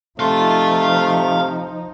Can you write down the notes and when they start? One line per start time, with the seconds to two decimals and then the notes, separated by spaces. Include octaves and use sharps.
0.20 C3 F3 A3 D#4 F5 C6